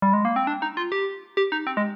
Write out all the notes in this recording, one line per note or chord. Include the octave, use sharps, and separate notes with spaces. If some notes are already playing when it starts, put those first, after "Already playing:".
G3
G#3
A#3
C4
D4
D#4
F4
G4
G4
D#4
C4
G#3